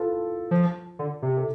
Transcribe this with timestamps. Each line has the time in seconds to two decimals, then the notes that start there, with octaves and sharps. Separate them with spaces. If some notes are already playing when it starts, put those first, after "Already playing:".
Already playing: F4 A4 B4
0.51 F3
0.99 D3
1.22 C3
1.37 A4